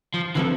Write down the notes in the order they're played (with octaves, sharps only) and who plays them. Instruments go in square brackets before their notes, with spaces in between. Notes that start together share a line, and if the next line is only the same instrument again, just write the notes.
[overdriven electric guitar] F3
[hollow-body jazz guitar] D3 F3 C4 F4 A4 [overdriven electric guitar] E3